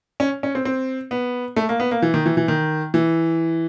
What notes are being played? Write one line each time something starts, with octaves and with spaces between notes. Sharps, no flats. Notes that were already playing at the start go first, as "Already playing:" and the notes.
C#4
C#4
C4
C4
B3
A3
A#3
B3
A#3
E3
D#3
E3
E3
D#3
E3